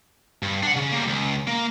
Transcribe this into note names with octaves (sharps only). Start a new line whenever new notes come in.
G2
D4 F#5
C#3
G3 A#3
C#2
A#3